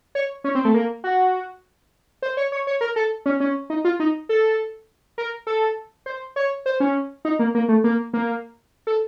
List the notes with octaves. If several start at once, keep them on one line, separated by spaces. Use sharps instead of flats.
C#5
C#4
C4
A3
A#3
F#4
C5
C#5
C#5
C#5
A#4
A4
C#4
C#4
D#4
F4
D#4
A4
A#4
A4
C5
C#5
C5
C#4
D#4
A#3
A#3
A3
A#3
A#3
A4